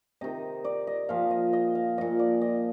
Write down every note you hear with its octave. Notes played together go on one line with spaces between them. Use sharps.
C3 D#3 D#5
D5
D#5
A#2 F3 F5
D#5
D#5
F5
A#2 F3 D#5
D5
D#5